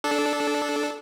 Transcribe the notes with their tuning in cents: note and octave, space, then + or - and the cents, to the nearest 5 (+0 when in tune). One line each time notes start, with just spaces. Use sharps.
D4 -5 A4 -15